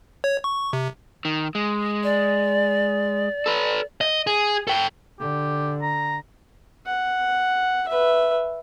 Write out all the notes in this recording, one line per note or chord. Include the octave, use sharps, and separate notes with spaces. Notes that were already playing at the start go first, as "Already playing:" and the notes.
C#5
C#6
C3
D#3
G#3
D5
A4 B4
D#5
G#4
A4 G5
D3 G4
A#5
F#5
B4 E5